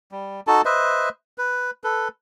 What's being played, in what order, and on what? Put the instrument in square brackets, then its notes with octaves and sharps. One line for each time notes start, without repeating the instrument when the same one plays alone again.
[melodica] G3
D#4 F#4 A4 A5
B4 C5 D#5 E5
B4
A4 B4